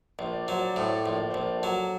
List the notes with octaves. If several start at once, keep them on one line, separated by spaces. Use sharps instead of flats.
A#1 C5
D5
F#3 C5
D5
A2 C5
D5
A#1 C5
D5
A#1 C5
D5
A4 C5
F#3